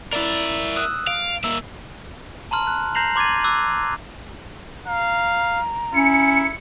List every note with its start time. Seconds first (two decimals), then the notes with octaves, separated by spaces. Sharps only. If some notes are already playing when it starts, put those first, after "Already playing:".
0.13 E4 A#4 D5 E5
0.76 D#6 E6 F#6
1.07 F5 D7
1.44 A#3 E5 E6
2.51 A5 A#5 C6 F6
2.67 F#6
2.95 A#5 G6 A#6 C7 F7 F#7
3.16 C6 D6 G#6 A6 D#7
3.44 D6 E6 F#6
4.86 F5 A#5
5.94 C#4 E4 C#7